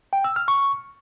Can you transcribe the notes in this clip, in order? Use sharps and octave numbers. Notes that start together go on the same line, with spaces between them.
G5
E6
F6
C#6